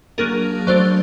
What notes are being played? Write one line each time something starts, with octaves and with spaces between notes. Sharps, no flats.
F#3 A#3 D4 G#4 A#4
F#3 A3 D4 C5 D5